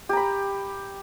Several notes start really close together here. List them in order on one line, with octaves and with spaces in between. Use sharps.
G4 A#5 B5